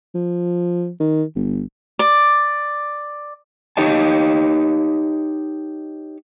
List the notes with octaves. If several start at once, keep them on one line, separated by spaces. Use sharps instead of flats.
F3
D#3
G1
D5
D#4 G4 C#5 D#5 A5